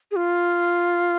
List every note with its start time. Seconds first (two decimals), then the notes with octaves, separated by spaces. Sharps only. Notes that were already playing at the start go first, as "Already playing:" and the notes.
0.11 G#4
0.16 F4